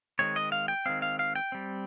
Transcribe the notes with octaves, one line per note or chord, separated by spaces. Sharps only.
D#3 G#3 C4 C#5
D#5
F5
G5
D#3 G#3 C4 F5
F5
F5
G5
G3 C4